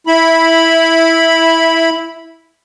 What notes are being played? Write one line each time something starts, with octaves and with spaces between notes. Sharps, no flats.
E4 B5